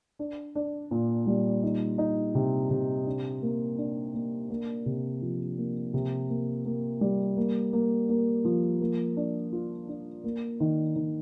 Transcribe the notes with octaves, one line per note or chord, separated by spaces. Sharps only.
D4
D4
A#2
G3
D#4
D#4
C3
C3
D4
A#3
D4
A#3
A#3
C3
F3
A#3
C3
A#3
A#3
G3
A#3
A#3
A#3
F3
A#3
D4
F4
D4
A#3
D#3
D#3